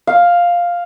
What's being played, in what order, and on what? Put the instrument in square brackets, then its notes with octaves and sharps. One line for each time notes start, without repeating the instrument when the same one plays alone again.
[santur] F5